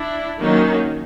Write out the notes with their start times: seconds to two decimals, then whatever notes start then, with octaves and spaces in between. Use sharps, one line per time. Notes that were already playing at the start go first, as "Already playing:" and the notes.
Already playing: D4 E4
0.41 D#3 F#3 A#3 C#4 D#4